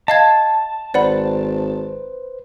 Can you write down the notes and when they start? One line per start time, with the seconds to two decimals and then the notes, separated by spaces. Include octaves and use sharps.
0.08 D#5 F5 A5 G#6
0.94 G#1 B4 C5 D5 F#5 B5